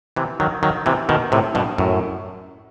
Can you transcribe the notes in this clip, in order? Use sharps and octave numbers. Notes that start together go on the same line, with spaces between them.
C3 E3
D#3 F#3
D#3 F#3
C3 E3
B2 D#3
A2 C3
G2 B2
F#2 A2